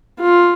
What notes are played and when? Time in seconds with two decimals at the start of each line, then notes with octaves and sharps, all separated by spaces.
0.20 F4